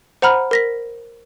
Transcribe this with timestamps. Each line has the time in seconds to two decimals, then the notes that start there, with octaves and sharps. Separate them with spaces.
0.22 C5 F#5 A#5 B5 F6
0.51 A#4 A#6 B6